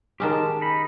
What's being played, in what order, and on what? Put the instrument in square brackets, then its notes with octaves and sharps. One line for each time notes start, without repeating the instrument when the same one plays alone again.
[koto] D#3 G#3 C#4 [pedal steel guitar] G4 A5
[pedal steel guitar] D#4 B5